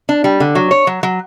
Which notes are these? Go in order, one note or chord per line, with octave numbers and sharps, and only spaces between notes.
D4
G3
D3
F#3
C#5
F#3
F#3